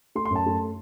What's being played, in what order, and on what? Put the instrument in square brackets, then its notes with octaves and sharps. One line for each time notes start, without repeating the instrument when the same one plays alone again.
[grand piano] A3 C6
C6
F#2
A5
A3